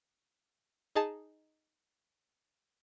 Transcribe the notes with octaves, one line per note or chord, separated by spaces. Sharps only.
D#4 G#4 A5